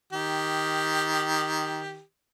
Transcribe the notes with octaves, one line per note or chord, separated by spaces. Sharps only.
D#3 G4